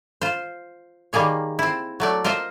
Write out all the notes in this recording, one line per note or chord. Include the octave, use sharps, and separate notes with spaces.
F4 C5
D#3 G3 A#3 G#4 C#5
C4 E4
F#3 A3 D5
F4 A#4 C5 D#5 E5